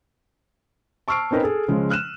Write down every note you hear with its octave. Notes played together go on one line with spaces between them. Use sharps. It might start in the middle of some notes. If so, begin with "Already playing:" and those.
A5 C#6 E6 F6 C7 D7
C4 C#4 D#4 A#4 B4
G#4 A4
C#3 F3 G#3
F6 F#6 D#7 E7